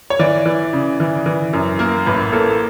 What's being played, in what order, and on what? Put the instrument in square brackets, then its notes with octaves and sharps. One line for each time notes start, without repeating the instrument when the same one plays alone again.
[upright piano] C#5
E3 D5
E3
C#3
E3
E3
F#2
A#3 A#4
A1 B4
A#3 A4